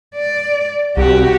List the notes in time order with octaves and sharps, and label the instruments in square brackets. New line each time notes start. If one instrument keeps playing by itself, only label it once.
[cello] D5
[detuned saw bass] C2 [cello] F#4 G4